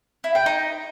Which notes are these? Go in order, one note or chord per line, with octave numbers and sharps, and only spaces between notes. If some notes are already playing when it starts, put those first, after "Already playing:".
E4
G5
D#4